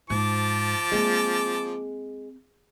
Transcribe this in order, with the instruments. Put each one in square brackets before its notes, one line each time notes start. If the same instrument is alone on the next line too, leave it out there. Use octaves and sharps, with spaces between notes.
[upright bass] G#2 [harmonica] F3 A5 D6
[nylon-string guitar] G#3 [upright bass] A#3 C4